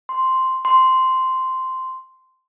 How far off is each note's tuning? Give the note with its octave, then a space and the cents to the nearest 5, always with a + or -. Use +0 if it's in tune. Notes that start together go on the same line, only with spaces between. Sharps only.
C6 -5
C6 -10